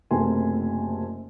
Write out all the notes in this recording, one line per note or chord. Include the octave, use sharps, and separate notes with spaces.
F#1 C3 A3 A#4 G#5 C6